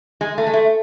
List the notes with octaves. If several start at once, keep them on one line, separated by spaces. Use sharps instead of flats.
G#3
A3
G#3
A3